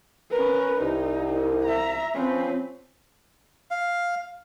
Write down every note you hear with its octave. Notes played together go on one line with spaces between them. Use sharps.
C#4 A#4 B4
C2 D#4
E5 A#5
F3 C4 C#4 B4
F5